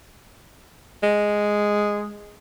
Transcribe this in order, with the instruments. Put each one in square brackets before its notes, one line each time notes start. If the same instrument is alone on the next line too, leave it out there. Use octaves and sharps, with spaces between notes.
[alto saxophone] G#3